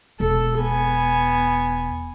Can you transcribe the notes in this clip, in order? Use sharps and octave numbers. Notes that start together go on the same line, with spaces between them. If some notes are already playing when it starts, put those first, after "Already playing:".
E1 A4
B3 G#5